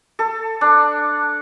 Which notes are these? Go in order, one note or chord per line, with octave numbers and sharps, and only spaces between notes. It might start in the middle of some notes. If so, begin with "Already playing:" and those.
A4
D4